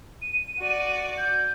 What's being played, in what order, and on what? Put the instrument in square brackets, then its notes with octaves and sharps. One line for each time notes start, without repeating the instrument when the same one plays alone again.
[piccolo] D#7
[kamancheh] F#4 D5
[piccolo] G6